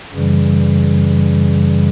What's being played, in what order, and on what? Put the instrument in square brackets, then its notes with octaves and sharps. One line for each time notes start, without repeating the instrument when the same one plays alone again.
[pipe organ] F#2 C#3 E3 G3